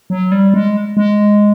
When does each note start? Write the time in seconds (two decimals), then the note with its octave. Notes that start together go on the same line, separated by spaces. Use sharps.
0.10 F#3
0.32 G3
0.54 G#3
0.97 G#3